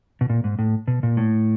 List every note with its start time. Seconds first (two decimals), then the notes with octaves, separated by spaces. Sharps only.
0.21 B2
0.30 A#2
0.44 G#2
0.59 A2
0.88 B2
1.03 A#2
1.17 A2